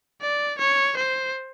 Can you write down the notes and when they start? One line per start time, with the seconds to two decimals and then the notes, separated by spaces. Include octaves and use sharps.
0.21 D5
0.59 C#5
0.97 C5